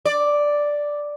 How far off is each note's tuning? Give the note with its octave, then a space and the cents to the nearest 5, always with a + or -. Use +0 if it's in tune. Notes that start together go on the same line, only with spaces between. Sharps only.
D5 +0